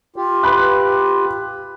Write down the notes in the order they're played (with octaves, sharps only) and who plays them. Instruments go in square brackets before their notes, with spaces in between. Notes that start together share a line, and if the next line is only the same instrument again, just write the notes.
[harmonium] F4 G4
[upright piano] B4 B5 F#6